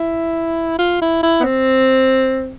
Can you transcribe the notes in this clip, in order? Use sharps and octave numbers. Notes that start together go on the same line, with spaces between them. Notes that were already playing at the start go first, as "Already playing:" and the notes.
Already playing: E4
F4
E4
E4
B3
C4